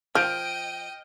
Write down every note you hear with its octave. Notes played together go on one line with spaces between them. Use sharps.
F3 D#5 G5 F6 G6 D7